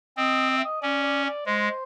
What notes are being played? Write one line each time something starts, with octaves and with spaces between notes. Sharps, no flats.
C4 D#5
D#5
E5
D#5
C#4 D5
D5
D5
G#3 C5